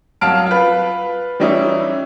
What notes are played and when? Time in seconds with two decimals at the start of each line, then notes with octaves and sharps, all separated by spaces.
0.21 C2 F#3 F5 A5 F6 D7
0.46 F4 B4
1.40 E3 G3 C#4 D#4 E4